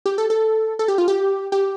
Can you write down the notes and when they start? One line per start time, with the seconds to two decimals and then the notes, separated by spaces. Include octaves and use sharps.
0.06 G4
0.18 A4
0.30 A4
0.79 A4
0.88 G4
0.98 F4
1.08 G4
1.52 G4